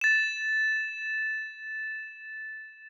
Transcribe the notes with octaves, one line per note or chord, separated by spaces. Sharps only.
A6 E7